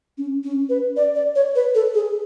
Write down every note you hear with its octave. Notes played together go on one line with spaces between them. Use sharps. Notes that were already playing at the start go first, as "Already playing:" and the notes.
C#4
C#4
B4
D5
D5
C#5
B4
A4
G#4